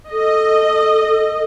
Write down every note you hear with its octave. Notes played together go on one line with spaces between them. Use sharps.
A4 D#5